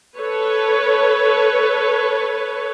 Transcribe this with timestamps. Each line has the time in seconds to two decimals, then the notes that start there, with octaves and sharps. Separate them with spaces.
0.17 A4 B4 C#5